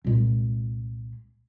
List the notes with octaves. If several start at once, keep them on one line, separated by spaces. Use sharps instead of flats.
C2 A#2 G#3